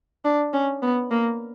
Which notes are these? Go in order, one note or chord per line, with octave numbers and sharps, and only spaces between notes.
D4
C#4
B3
A#3